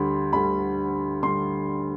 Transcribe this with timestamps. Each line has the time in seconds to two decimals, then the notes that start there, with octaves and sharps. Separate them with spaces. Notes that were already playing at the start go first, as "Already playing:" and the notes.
Already playing: D2 D3 G3 B5
0.33 D2 D3 G3 B5
1.23 D3 G3 C6